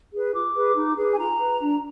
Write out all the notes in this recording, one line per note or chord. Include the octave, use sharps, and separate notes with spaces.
G#4 B4
F4 D6
G#4 B4
D#4
G#4 B4
G#5
F4 A#5
B4
D4